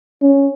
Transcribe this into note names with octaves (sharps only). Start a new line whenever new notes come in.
C#4